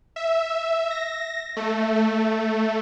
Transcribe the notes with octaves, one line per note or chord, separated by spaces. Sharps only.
E5
A#6
A3
A3